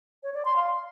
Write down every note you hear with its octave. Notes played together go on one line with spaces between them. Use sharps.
C#5
D5
C6
F5